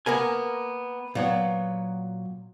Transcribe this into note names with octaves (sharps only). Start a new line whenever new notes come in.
A#3 B3 A#4 G#5
A#2 F#3 B3